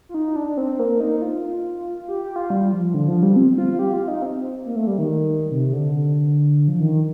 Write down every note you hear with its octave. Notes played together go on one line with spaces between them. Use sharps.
F4
D#4
D4
D4
C4
A#3
D#4
F4
G4
G4
F4
G3
F3
D3
F3
G3
C4
F4
G4
F4
D#4
C4
A#3
A3
G3
D#3
C3
D3
F3
D#3